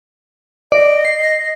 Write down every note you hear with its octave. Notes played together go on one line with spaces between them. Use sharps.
D5 D#5
C7